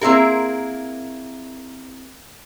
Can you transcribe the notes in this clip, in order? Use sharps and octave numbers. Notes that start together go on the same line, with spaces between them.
A#3 C4 E4 G#4 A#4